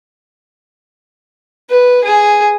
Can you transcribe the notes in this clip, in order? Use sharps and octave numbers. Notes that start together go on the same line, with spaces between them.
B4
G#4